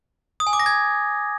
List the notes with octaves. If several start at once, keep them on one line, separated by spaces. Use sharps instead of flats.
D#6
G#5
D6
A#6
G#6